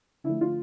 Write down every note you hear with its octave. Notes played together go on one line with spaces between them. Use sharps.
D3 F3 A3 E4
F4